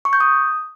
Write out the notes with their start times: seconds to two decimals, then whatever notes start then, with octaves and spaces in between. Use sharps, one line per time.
0.05 C#6
0.13 G6
0.20 D#6